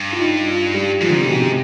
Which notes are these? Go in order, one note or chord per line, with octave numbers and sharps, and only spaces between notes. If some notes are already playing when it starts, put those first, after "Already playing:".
Already playing: G2
F4
D#4
F4
G3
G#2 F3
D3
C3
B2
C3